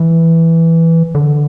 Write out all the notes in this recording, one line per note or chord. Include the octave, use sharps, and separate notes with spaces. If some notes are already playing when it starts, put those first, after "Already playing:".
Already playing: E3
D3